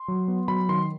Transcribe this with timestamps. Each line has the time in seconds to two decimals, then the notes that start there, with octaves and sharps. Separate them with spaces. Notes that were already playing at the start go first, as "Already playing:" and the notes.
Already playing: C6
0.08 F#3
0.28 B3
0.48 F#3 B5
0.69 D#3 C6